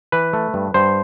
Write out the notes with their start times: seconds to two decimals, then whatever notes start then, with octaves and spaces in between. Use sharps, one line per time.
0.12 E3 B4
0.33 A3
0.54 G2
0.74 G2 C5